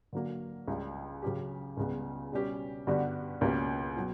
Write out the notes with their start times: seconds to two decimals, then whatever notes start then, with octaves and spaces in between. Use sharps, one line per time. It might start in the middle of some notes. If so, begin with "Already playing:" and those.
0.13 D3 F#3 A#3
0.68 C#2 C#3 G3
1.22 C#3 F#3 C#4 G4
1.77 C#2 C#3 G3 B3
2.32 B2 G3 C#4 G4
2.87 G2 D3 G3 B3 F#4
3.41 C#2 B2 A#3 C#4 G4
3.96 B2 F#3